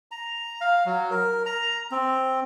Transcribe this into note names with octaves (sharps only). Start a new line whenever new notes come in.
A#5
F5
F#3
A#4
A#5
C4